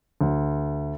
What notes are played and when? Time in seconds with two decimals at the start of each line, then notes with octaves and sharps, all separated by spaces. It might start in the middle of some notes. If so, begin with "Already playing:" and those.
0.21 D2